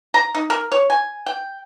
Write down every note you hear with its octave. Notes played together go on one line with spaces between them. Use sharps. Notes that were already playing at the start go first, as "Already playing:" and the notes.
A#5
D#4
A#4
C#5
G#5
G5